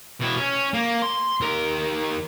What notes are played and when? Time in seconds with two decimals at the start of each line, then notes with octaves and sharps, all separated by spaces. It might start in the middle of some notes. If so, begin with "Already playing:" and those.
0.21 B2 E4
0.36 C#4
0.74 A#3
1.02 C6
1.41 D#2 A#4